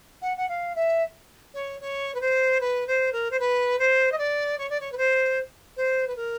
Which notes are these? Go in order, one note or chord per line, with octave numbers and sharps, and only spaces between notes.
F#5
F#5
F5
E5
C#5
C#5
B4
C5
B4
C5
A#4
C5
B4
C5
D#5
D5
C#5
D5
C#5
B4
C5
C5
B4
A#4